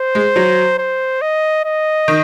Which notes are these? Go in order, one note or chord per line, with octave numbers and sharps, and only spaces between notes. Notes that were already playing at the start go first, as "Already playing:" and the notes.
Already playing: C5
G#3
F#3
C5
D#5
D#5
D#3